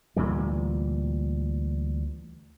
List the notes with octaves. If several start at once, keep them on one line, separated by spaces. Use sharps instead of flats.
D2 A#2 E3 G3